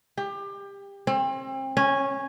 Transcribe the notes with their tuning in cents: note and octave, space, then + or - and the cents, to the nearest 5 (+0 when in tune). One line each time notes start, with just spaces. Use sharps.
G4 +25
C4 +35
C#4 -10